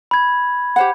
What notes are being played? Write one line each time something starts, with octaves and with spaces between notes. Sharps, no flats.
B5 G#6
G4 C5 F#5